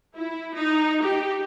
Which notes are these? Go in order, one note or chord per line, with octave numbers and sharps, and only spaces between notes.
E4
D#4
G4